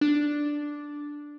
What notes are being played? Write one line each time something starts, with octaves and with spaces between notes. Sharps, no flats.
D4